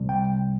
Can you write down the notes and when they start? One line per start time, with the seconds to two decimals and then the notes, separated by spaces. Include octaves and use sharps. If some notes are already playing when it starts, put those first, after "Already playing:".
Already playing: C2 C3 G3
0.09 G5